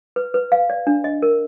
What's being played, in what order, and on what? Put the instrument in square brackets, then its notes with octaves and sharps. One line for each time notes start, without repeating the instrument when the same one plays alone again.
[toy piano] B4
B4
F5
D5
D4
D#5
A#4